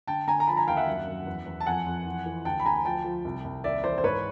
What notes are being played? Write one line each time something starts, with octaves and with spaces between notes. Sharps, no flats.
D3 G5 A5
D3 G#5 A#5
A#5
F3 A5 B5
G#5 A#5
D#2 F5 G5
E5 F#5
F#2
F#2
E2
E2
A5
F2 F#5 G#5
F2
E3
E3
D2 G5 A5
B5
D2 G#5 A#5
F3 G5 A5
F3
C2
C2
D#2 D5 E5
E3 C5 D5
C5
G#2 B4 C#5